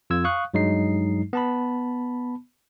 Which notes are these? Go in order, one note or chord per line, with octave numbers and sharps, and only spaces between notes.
F2 F4 E6 G#6
F5 C#6 D#6 F#6
G2 F#3 G#3 D#4 C7
B3 A5 B5